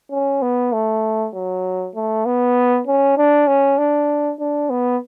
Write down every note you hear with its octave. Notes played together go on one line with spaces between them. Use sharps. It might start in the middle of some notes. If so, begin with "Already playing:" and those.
C#4
B3
A3
F#3
A3
B3
C#4
D4
C#4
D4
D4
B3